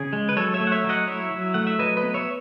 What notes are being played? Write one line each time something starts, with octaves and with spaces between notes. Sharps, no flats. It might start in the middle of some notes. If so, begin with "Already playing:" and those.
Already playing: C#3 G#4
G#3
B4
F#3 A4 C#5
C#5 E5
A3
F#5
C#5 E5
F#3
D#5 F#5
E4 C#5 E5
F#3
A3 F#5
E5
F#3 B4 D#5
B4 D#5
B3
C#5 E5